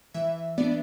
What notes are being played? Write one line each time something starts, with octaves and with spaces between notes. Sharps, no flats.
E3 E5
B3 D4 D5